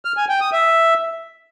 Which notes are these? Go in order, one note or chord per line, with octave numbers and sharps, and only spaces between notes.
F6
G#5
G5
D#6
E5